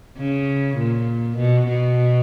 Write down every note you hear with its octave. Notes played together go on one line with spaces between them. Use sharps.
C#3
A#2
B2
B2